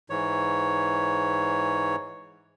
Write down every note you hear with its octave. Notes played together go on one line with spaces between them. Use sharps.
G#2 E3 C#5